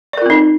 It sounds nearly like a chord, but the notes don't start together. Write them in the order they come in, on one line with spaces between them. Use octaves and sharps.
D5 A#4 F4 C4 D#4